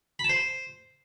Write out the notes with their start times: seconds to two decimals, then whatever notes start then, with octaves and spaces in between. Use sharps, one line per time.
0.19 B5
0.24 A5
0.29 C5